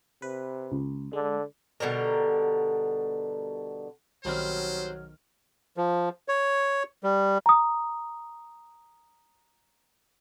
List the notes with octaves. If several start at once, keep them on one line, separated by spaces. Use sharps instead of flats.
C3 B4
C#2
D3 G#3
B2 D3 G3 A#4
B1 D#3 F#3 G3 C4 C5 F6
F3
C#5
G3
A#5 D#6